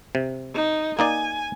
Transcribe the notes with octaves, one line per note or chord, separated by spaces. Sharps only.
C3
D#4
A#3 D#4 D5 G#5